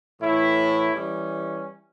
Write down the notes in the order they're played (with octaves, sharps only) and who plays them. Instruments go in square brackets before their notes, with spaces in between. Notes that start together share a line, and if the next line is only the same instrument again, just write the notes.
[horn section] A2 E3 A3 E4
E3 G3 C#4